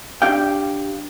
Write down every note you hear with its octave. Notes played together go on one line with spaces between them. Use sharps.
D4 G4 F5 G5